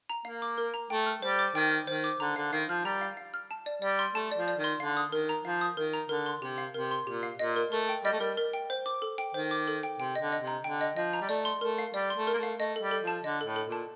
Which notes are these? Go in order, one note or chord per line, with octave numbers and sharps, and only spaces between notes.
A#5
A#3 F5
D6
A#4
A#5
A3 G5
F6
G3 C5
D6
D#3 G5
F6
D#3 C5
D6
D3 A#5
D3 F5
D#3 F5
F3 F6
G3 A#5
F5
F5
F6
A5
D5
G3 D5
C6
A3 A5
D5
F3
D5
D#3
C6
D3 F5
D#6
D#3 A#4
A#5
F3 F5
D#6
D#3 A#4
A#5
D3 A#4
C6
C3 G4
F5
C3 A#4
C6
A#2 G4
F5
A#2 D#5
A#4
A3 A#4
G5
G3 D#5
A3
G3 A#4
A#4
G5
C5
D6
A4
G5
D#3 C5
D6
A4
G5
C3 G5
D3 D#5
D#5
C3
A#5
D3 G5
D#5
F3 D#5
A#5
G3
A3 D5
C6
A3 A#4
F5
G3 D5
C6
A3
A#4
A#3
A3 F5
A3 D#5
A4
G3
A4
F3 A5
D3 D#5
A2 A4
A4
A#2
A5